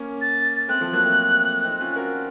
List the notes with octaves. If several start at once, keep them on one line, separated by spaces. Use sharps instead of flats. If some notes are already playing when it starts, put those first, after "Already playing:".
Already playing: A#3 C#4
A6
A3 C4 F#6
F3 A3
F#3 A#3
A3 C4
C4 D#4
C#4 F4
F#4 A#4